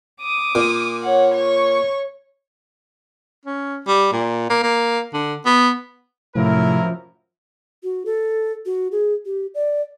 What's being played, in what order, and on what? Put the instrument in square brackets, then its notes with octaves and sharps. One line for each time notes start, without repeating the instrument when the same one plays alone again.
[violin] D6 D#6
[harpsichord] A#2
[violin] C#5 F#5
C#5 C#6
[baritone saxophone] C#4
G3
A#2
A#3
A#3
D3
B3
[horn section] F#2 E4 A#4 [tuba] A2 [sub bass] C3 [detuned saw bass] F3
[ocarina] F#4
A4
F#4
G#4
G4
D5